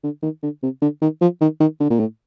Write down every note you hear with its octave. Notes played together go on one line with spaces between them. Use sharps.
D3
D#3
D3
C3
D3
D#3
F3
D#3
D#3
D3
A#2
A2